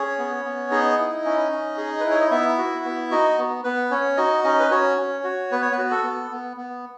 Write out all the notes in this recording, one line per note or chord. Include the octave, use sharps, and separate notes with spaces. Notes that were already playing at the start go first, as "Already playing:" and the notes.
Already playing: C#4 G#4 C#5
B3
B3
D#4 G#4 D#5
E4
C#4
C#4
G#4
E4 B4
C#5
D#5
B3 E4 E5
F#4
B3
D#4 F#4 D#5
B3
B3 B4
C#4 C#5
D#4 F#4 D#5
C#4 D#4 D#5
B4
C#4 F#4 C#5
C#4
F#4
B3 B4
C#5
B3 B4
F#4
A4
B3
B3
B3